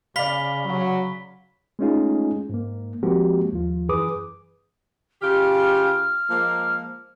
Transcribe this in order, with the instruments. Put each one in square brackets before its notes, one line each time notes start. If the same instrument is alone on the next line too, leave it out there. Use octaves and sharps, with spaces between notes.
[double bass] C#3 [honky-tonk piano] D5 F5 [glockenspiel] B5 B6 G7
[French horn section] F#3
[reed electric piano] G#3 A3 C#4 D#4 F4 G#4
G#2 A#3
F3 G#3 A#3 C4 F#4 G4
D#2 F3 F4
F#2 E3 G#4 B4 D6 D#6
[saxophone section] C#3 F4 G4 [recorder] F6
[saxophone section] F3 G#3 A#3